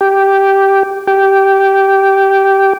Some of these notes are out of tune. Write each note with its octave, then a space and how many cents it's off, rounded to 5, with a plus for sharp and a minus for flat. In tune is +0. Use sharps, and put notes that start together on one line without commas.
G4 -5
G4 -10